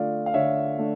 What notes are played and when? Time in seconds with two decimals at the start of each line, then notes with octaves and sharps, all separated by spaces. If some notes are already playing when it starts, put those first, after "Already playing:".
Already playing: D3 A3 D4 F4 D5 F5
0.26 F5
0.34 D3 C#5 E5
0.78 A3 D4